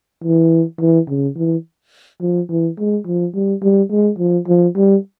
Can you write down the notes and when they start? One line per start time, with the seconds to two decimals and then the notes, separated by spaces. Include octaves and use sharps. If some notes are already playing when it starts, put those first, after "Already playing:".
0.24 E3
0.80 E3
1.08 C#3
1.36 E3
2.21 F3
2.50 E3
2.79 G#3
3.07 F3
3.35 G3
3.62 G3
3.91 G#3
4.19 F3
4.48 F3
4.76 G3